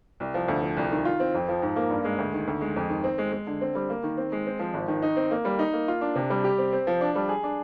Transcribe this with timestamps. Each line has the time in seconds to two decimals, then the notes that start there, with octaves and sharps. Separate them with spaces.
0.20 C2
0.34 F3
0.48 D2
0.62 F3
0.77 C2
0.92 D#3
1.05 F4
1.20 C4
1.34 F2
1.48 F3
1.62 G#2
1.76 A#3
1.90 G2
2.04 G#3
2.18 D2
2.33 D#3
2.47 D2
2.61 G#3
2.76 F2
2.89 D#3
3.04 C4
3.18 G#3
3.32 G#3
3.47 D3
3.61 C4
3.75 G3
3.90 A#3
4.03 D#3
4.17 C4
4.32 G#3
4.46 C4
4.59 F3
4.74 G#1
4.88 D#3
5.02 D#4
5.16 C4
5.31 A#3
5.45 G3
5.59 D#4
5.73 A#3
5.88 F4
6.01 D4
6.15 C3
6.30 G3
6.44 G4
6.58 C4
6.73 C4
6.87 F3
7.01 D4
7.15 G3
7.29 G#4
7.43 D4